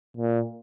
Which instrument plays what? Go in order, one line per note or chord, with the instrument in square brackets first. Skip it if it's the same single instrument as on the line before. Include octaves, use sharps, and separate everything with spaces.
[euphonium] A#2